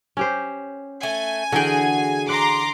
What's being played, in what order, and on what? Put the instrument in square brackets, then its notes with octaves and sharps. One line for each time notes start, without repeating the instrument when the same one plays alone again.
[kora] C#4 G4 C5
[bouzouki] A3 [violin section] G#5
[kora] D3 E3 G5 [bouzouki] F#4 G#4
[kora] F#5 [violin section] A#5 C6 D6